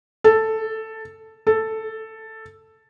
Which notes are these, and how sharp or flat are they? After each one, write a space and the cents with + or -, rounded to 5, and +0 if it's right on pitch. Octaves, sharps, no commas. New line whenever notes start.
A4 +5
A4 +5